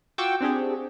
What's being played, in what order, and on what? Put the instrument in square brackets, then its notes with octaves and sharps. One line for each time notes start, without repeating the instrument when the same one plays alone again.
[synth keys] F4 F#4 G5 C#6 D6 E6
C4 D4 G4 G#4